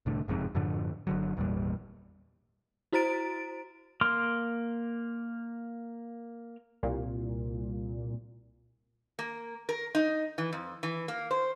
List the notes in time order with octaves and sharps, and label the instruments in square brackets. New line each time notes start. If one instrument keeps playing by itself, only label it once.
[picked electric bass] C2 A2 D3
F#1 F2 G#2 C3
F#2 A2 D3 F3
G1 D3 F#3
G#1 E2 A#2 G3
[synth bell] E4 F#4 C5 A#5 A6 D7
[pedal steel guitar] A#3 C6 D6 F6
[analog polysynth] C2 A#2
[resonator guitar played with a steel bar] A#3
A#4
D#4
E3
F2
E3
A#3
C5